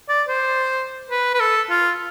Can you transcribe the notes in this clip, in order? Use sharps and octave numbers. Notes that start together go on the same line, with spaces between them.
D5
C5
B4
B4
A4
F4